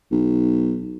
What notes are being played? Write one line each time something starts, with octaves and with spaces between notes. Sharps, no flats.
B1